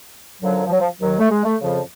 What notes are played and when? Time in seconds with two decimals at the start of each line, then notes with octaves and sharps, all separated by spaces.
0.41 F#2 D3 F3 F#3
0.67 F3
0.71 F#3
0.80 F3
1.01 D#2 D#3 F#3
1.19 A3
1.31 G#3
1.45 A3
1.60 F2 C#3 F3